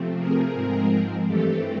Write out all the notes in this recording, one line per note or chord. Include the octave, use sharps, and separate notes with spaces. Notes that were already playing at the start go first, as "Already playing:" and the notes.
Already playing: C3 F3 A3 C4
G#4 A#4
G#2 F3 G#3 C4
G2 E3 A3 C4 G4 A4